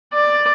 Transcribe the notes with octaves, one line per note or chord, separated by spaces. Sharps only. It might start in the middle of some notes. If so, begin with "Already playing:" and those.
D5